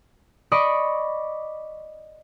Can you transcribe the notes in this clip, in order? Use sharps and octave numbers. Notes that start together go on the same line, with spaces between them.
D5 D#5 B5 C#6 D6 D7